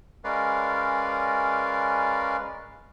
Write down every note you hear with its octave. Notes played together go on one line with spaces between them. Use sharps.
G#3 C#4 A#4 B4 D5 F5